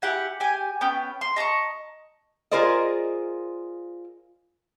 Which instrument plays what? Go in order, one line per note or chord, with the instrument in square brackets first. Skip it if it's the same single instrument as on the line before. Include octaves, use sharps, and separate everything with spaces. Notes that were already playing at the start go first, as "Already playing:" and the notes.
[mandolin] E4 G4 F#5 G#5
G4 G5 G#5
B3 C#4 G5
C6
D#5 A5 A#5 C#6
[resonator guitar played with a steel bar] F4 G#4 A#4 C5 D5 D#5